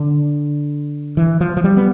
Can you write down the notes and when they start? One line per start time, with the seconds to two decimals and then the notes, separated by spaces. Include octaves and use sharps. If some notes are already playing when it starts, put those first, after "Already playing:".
Already playing: D3
1.17 E3
1.41 F3
1.57 F3
1.64 G3
1.77 B3